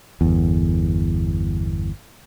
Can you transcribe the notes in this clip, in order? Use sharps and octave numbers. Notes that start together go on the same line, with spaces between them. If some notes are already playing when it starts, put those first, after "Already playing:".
G1 E2